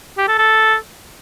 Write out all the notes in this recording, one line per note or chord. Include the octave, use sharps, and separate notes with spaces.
G4
A4
A4